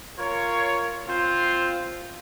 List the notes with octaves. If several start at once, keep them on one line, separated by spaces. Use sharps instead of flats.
F4 A#4 C#5
C4 F4 C5